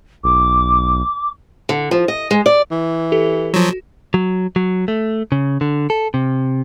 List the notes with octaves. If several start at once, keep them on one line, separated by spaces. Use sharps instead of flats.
B1 D6
D3
F3
D#5
G#3
D5
E3
G4 A4
F3 F#3 F#4
F#3
F#3
A3
C#3
D3
A4
C3